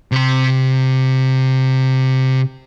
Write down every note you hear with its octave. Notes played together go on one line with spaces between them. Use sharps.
C3 C6